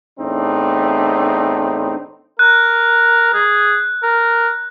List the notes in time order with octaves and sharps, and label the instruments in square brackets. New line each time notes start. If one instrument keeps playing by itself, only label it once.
[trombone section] E2 A2 C4 D4 D#4
[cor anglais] A#4 [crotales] F#6
[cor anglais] G#4
A#4